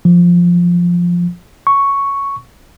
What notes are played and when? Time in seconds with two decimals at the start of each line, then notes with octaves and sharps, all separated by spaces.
0.05 F3
1.67 C#6